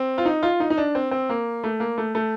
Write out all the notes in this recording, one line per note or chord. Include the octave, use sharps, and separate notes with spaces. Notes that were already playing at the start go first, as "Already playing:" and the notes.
Already playing: C4
F4
D#4
F4
D#4
D#4
D4
C4
C4
A#3
A3
A#3
A3
A3